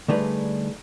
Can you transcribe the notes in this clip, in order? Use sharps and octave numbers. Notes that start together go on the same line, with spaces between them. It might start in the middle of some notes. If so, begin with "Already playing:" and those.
D3 G3 A3 D#4 G#4 B4